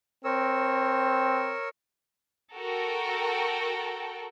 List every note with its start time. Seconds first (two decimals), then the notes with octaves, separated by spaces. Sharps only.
0.24 C4 A#4 C#5 E6
2.55 F#4 A4 A#4 G5